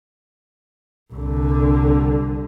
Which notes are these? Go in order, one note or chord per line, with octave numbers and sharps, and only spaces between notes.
C2 D3